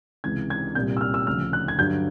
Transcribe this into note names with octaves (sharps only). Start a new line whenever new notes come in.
C#2 C3 E3 G#3 G#6
G#6
C2 A#2 G3 G6
E6
F6
E6
D2 C#3 F3 F6
F#6
G#6
G2 D3 F#3 G6